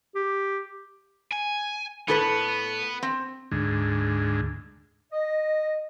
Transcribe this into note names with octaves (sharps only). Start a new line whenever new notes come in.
G4
G#5
A2 B3 A4 B4
C4
D2 G#2
D#5